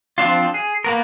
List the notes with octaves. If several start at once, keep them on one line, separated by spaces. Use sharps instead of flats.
F3 C4 D4 F4
G#4
A#3 B3 A#4